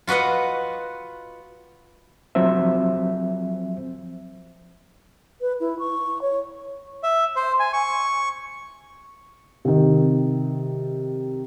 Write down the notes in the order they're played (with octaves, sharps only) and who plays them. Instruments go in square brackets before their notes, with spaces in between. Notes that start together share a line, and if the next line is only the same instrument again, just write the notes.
[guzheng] F4 F#4 B4 D#5 F#5
[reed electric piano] F3 F#3 C4 C5 E5
[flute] B4
E4
C#6
C#5
[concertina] E5
C5
G#5
C#6
[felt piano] C3 D#3